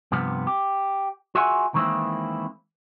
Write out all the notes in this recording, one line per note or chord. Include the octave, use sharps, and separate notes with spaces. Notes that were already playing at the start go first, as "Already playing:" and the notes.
G2 C3 F3 B3
G4
F4 F#4 G#4 E5 F#5 G#5
D#3 E3 G#3 A#3 C4 E4